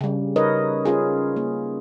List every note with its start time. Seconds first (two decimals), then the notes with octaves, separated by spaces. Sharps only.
0.01 C#3 G3
0.36 D#4 A#4 B4 C#5 D#5
0.85 C#4 F4 G#4
1.36 A#3